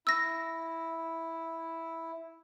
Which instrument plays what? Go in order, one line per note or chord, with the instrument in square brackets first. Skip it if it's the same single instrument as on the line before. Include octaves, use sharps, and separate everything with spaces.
[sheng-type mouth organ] E4 [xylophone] E6 A#6